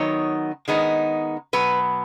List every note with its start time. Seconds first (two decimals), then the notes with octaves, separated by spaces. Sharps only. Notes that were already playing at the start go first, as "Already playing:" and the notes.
Already playing: D#3 F#3 B3 D#4 C#5
0.68 D#3 G#3 B3 D#4
1.53 B2 F#3 B3 B4